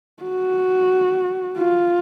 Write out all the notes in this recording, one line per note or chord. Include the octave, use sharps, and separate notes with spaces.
F#4
F4